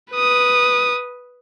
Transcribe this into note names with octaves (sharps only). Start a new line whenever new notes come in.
B4 D#6